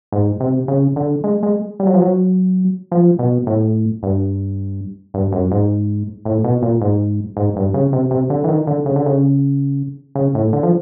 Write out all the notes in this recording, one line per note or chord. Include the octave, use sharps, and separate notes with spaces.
G#2
C3
C#3
D3
G#3
G#3
G3
F#3
F3
F#3
F3
B2
A2
G2
G2
F#2
G#2
A2
B2
A#2
G#2
G#2
G2
C#3
C3
C3
D3
E3
D#3
D3
C#3
D3
C#3
C#3
A2
D3
F3